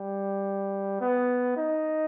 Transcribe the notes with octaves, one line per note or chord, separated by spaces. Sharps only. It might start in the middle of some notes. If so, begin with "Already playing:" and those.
Already playing: G3
B3
D#4